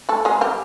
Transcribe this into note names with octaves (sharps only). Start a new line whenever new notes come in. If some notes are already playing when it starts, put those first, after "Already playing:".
A3 A4
G#3 G#4
G3 G4